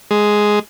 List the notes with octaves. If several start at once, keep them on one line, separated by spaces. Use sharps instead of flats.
G#3